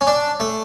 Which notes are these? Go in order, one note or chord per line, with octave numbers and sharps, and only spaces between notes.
C#4
D4
A3